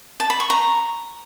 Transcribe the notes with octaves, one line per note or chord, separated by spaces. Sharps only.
A5
B5
C#6
A#5